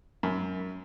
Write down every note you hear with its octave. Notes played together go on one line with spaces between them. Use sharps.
F#2